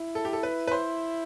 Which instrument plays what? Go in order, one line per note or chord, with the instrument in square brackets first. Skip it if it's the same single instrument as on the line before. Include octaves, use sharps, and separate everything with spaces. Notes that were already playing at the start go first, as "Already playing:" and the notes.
Already playing: [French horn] E4
[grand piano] A4
G4
A4
B4
B4
C5